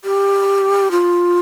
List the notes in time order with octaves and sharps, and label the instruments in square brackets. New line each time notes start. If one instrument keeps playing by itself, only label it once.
[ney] G4
F4